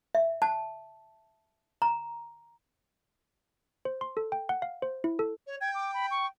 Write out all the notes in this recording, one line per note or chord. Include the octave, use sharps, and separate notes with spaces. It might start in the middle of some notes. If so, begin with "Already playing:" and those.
E5
A5
A#5
C5
C6
A4
G5
F#5
F5
C5
E4
A4
C#5
G5 G#6
D6
B5
C#6